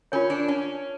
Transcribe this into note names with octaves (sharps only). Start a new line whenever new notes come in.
C#4 F4 A#4 C#5
D4
C#4